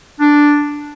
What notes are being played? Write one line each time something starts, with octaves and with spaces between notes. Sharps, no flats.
D4